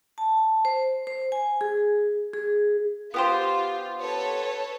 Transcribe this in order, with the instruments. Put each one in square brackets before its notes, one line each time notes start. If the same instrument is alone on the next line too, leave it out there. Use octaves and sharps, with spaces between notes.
[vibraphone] A5
C5
C5
G#5
G#4
G#4
[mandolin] B3 G4 C5 [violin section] F4
[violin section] A4 B4 C#5